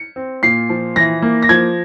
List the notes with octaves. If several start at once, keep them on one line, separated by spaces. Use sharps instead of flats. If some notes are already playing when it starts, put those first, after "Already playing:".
Already playing: C#7
C4
A#2 C7
F3
E3 A#6
A#3
A#6
F3 G#6